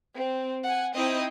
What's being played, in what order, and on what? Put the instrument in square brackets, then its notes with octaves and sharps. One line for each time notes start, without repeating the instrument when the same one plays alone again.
[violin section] C4
F#5 G#5
C4 D#4 E4 D#5 G5